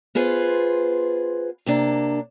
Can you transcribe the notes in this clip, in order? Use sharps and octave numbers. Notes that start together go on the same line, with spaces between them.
B3 F4 G#4 B4 C5
C3 A#3 D4